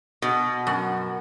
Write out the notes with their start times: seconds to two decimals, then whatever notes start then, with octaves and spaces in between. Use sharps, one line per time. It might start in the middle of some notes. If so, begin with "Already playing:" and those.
0.22 B2
0.67 F#2